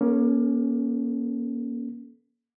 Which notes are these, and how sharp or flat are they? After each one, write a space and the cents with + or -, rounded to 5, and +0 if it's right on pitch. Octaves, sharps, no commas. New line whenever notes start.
A#3 +25 C#4 +0 A4 -15